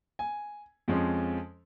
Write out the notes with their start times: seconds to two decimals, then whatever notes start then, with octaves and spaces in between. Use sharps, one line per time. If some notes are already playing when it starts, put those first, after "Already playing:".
0.19 G#5
0.88 F2 F3 G#3 C#4